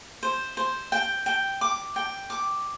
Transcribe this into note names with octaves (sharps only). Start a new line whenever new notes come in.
C5
C5
G5
G5
D6
G5
D6